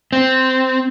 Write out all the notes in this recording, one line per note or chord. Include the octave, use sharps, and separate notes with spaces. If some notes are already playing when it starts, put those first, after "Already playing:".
C4